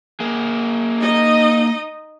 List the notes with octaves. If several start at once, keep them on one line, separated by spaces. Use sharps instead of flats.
A#3 G#4
D#4 D#5